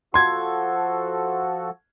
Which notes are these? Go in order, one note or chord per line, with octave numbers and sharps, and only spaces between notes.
F3 F#4 A4 C6 G#6